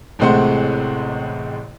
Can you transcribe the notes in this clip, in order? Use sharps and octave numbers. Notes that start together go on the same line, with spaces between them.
A1 A2 C3 G#3 C5 F#5